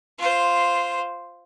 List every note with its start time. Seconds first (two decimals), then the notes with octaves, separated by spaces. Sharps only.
0.18 F4 C5